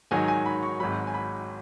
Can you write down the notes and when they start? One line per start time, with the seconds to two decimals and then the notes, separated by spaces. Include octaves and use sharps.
0.11 G#2 D#3 F#3 D#4 G#5
0.28 G#5
0.46 B5
0.63 C#6
0.80 G#1 G#2 F#3 B5
1.07 G#5
1.14 B5